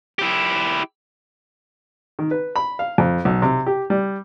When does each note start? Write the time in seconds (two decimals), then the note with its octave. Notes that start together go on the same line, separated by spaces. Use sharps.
0.19 E4 G4
2.19 D#3
2.31 B4
2.56 B5
2.79 F5
2.98 F2
3.25 B1
3.42 C3
3.67 G4
3.90 G3